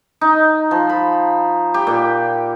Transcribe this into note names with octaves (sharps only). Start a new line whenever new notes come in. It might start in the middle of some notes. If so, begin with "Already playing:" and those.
D#4
F3
B5
G4
A#2